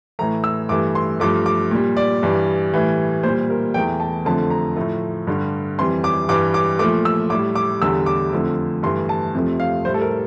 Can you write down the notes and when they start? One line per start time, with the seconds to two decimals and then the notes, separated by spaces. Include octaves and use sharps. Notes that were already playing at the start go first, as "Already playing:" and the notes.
0.19 A2 E3 A3 A#5
0.44 E6
0.69 G2 E3 A3 D6
0.95 C6
1.20 G2 F3 A3 D6
1.46 D6
1.71 A#2 G3
1.97 D5
2.23 G2 E3 G3
2.74 A2 E3 G3
3.23 A#2 G3 C5
3.50 A#4
3.74 E2 E3 A3 G5
4.00 A5
4.25 F2 D3 F3 A3 A5
4.50 A#5
4.77 A2 F3 A3
5.27 G2 D3 G3
5.78 F2 E3 G3 C6
6.04 D6
6.29 G2 E3 G3 D6
6.54 D6
6.79 A#2 F3 A3 D6
7.05 E6
7.30 A2 D6
7.35 G3
7.55 D6
7.82 E2 D3 G3 E6
8.06 D6
8.33 F2 D3 F3 A3
8.83 G2 E3 A3 C6
9.09 A5
9.34 F2 C3 F3 A3
9.60 F5
9.85 A2 G3 C5
9.94 A4
10.01 A#4